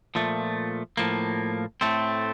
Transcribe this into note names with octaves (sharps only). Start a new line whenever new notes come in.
A#2 F3 A3
A2 F3 A#3
A2 A3 C4